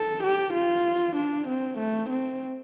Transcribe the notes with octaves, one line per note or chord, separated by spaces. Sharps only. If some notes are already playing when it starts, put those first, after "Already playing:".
Already playing: A4
G4
F4
D4
C4
A3
C4